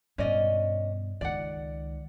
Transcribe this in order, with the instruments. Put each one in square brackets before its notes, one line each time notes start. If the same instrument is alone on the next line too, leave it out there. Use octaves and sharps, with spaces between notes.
[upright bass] G2 B2 [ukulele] C#4 D5 D#5
[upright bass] C#2 D#3 [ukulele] D5 F#5